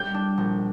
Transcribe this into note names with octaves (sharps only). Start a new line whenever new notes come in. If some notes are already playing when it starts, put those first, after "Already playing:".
Already playing: G3 G6
D4
A#1